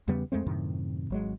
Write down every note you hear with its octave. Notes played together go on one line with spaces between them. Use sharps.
E2 C#3 G3 B3
F2 G#3 A3 C4
F#2 A2 C3 D#3
G#1 F#3 G#3